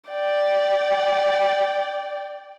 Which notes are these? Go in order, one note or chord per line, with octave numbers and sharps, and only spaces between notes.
D5 G5